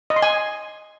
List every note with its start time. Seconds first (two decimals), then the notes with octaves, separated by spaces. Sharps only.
0.10 D#5
0.16 C6
0.23 G#5